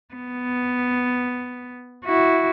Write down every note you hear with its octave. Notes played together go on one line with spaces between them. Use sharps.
B3
E4 F#4